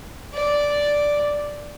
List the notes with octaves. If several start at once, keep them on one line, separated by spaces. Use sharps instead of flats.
D5